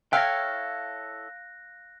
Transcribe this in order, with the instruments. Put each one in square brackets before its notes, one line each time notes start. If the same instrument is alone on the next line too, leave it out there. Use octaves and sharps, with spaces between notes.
[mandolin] E4 A4 C#5 [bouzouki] F5 [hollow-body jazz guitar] G5 [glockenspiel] F#6 A#6